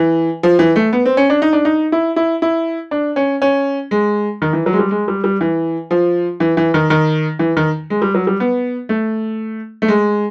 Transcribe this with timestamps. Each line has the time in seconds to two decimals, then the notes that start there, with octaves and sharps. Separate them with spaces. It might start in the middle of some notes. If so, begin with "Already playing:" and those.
Already playing: E3
0.43 F3
0.59 E3
0.76 A3
0.93 B3
1.05 C4
1.17 C#4
1.30 D4
1.42 D#4
1.53 D4
1.65 D#4
1.92 E4
2.16 E4
2.42 E4
2.91 D4
3.16 C#4
3.42 C#4
3.91 G#3
4.42 D#3
4.53 E3
4.66 F#3
4.73 G#3
4.79 G3
4.91 G#3
5.08 G3
5.24 G3
5.41 E3
5.91 F3
6.40 E3
6.57 E3
6.74 D#3
6.90 D#3
7.39 E3
7.57 D#3
7.90 G#3
8.02 G3
8.14 F#3
8.27 G3
8.40 B3
8.89 A3
9.82 A3
9.88 G#3